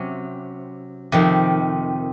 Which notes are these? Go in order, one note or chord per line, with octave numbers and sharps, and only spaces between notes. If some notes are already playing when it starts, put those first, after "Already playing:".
Already playing: C3 F#3 C#4
F2 C3 D#3